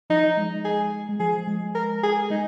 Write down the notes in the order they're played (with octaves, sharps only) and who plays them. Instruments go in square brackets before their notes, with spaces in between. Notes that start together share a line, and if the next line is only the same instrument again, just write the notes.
[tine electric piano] F3 [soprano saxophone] D#4
[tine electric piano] G#3
[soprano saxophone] G#4
[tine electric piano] G#3
[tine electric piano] F3 [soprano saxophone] G#4
[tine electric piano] G#3
[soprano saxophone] A#4
G#4
[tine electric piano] G#3 [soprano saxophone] D#4